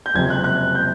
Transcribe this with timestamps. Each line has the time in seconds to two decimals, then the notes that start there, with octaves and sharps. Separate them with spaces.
0.06 G6
0.14 F#1 F2 C3 G#6
0.30 F#6
0.44 F#6
0.75 G6